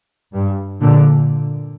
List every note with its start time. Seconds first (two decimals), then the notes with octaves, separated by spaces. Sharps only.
0.34 G2
0.82 A#2 D3